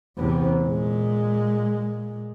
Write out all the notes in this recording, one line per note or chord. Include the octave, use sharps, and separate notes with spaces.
E2 C3
A#2 G#3